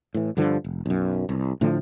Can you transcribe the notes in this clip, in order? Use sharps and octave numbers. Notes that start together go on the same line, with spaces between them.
A2 E3
G2 D3 F3
F1
B1 F#2
C2
A2 D3 F3 A3